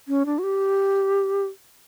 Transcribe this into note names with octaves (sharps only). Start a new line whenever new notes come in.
C#4
D4
F#4
G4